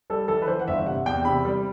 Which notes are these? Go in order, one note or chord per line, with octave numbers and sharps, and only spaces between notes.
G3 A4
E3 A4
B4
E3 C5
F#5
G1 E5
C3 F#5
E2 G5
C3 B5
G3